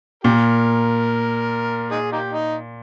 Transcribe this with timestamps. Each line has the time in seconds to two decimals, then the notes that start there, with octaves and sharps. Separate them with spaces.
0.24 A#2 G4 A#4
1.91 D#4 G#4
2.12 A#3 D#4 G4
2.33 D#4